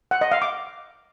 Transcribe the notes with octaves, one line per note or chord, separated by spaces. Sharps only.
F#5
D#5
F5
D6